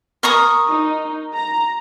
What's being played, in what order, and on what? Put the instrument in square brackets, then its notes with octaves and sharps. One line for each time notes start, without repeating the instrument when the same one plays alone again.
[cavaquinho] A#4 C#6 D#6
[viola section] D#4
A#5